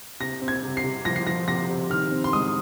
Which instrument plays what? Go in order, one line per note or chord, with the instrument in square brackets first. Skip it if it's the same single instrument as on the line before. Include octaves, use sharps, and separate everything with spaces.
[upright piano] C3 A#6
C4
G#6
C3
C7
C3
F3 A#6
C7
F3 A#6
C3 A#6
C3
D#3 F6
C4
C6
G#3 D#6